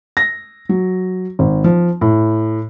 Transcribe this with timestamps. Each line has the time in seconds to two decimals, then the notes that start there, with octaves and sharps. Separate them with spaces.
0.17 A#6
0.69 F#3
1.39 G#1
1.64 F3
2.01 A2